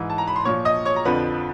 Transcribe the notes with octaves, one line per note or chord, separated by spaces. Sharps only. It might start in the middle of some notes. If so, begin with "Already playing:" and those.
Already playing: G#2 E3
A5
A#5
B5
C6
A#2 F3 C#5 C#6
D#5 D#6
C#5 C#6
A#5
F2 D3 F3 B4 B5